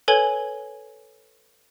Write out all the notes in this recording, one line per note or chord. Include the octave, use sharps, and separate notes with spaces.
A4 B4 C#5 G#5 G#6 G7